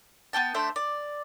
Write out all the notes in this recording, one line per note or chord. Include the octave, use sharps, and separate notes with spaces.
B3 F4 G5 A5
A3 D4 C5 E5
D5